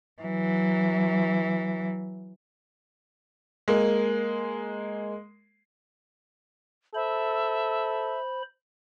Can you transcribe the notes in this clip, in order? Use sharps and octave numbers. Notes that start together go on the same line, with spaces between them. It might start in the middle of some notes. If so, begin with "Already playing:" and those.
E3 F#3
G#3 A#3
A4 C5 E5 B5